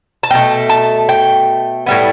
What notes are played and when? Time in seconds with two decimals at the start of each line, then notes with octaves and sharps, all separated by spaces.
0.23 A5
0.31 B2 A3 G5
0.69 A5
1.09 G5
1.87 A2 G3 B3